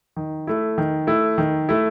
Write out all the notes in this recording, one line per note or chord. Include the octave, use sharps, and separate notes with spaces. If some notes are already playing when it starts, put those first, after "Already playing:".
D#3
A3 E4
D#3
A3 E4
D#3
A3 E4